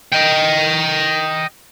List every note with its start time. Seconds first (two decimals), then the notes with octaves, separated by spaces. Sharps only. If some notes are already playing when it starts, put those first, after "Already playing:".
0.12 D#5 G5